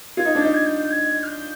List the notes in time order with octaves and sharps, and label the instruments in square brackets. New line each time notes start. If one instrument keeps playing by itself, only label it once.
[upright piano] F4 [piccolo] G#6
[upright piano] D#4
D4
[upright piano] D#4 [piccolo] G6
[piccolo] G#6
G6
G6
G#6
F6
G6